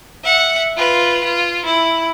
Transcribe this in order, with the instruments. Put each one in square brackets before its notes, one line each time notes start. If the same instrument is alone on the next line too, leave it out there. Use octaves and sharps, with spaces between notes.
[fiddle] E5 F#5
F4 B4
F4
E4